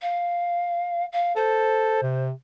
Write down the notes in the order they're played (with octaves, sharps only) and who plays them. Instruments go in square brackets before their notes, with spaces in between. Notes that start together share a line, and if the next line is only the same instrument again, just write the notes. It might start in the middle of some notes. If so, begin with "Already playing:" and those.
[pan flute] F5
F5
[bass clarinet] A4 [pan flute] C5
[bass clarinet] C3